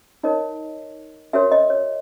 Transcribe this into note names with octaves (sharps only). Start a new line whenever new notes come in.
D#4 A#4 C#5 D#5
F#4 A#4 C#5 E5
D#5
C#5